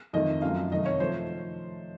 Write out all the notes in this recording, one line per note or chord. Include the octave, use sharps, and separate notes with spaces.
F2 D#3 A3 D#5
F#2 F3 A3 F5
C3 D#3 A3 D#5
C#5
F3 A3 C5